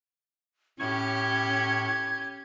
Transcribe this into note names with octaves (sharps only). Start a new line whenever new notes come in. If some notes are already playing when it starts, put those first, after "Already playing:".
A2 C#4 G4 C#6 G#6